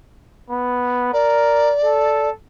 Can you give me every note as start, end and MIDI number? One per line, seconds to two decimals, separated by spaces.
0.50 1.09 59
1.13 1.71 70
1.13 2.29 74
1.84 2.31 69